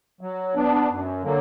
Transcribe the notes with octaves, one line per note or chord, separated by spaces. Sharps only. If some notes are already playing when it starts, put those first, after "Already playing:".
F#3
B3 D4
F#2
D3 F#3 A#3